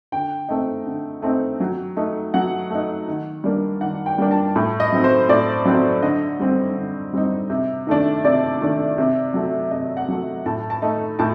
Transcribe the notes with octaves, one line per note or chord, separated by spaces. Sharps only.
D3 G5
A3 C4 D#4
D3
A3 C4 D#4
F#3
A3 D#4
F#3 F#5
A3 D#4
D#3
G3 A#3 D4
D#3 F#5
G5
G3 A#3 D4
A5
A2
D#5
F#3 C4 D#4
C5
A2 D5
F#3 C4 D#4
D3 D#5
G3 C4 D#4
D3
G3 C4 D#4
C3
D#3 A3 D4
C3 D5
D#3 A3 D4
C3
F#3 A3
C3 D#5
F#5
F#3 A3
A2 A5
A5
A3 D#4
A2 A5